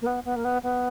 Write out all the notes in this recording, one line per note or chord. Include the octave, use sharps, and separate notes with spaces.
A#3
B3
B3
A#3
B3
B3